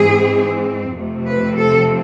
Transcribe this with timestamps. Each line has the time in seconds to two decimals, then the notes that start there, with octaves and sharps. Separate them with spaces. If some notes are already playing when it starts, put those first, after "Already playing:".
Already playing: G#2 E3 G#3 C4 G#4
0.97 F2 C3 F3 A3 C4
1.27 B4
1.56 A4